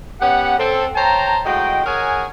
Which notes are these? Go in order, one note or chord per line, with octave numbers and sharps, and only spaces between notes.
B3 C#4 G4 F#5
C4 A4
C5 C#5 G5 A5 A#5
A2 G#3 F#4 D#5 G5
G#4 A#4 C#5 F#5 G#5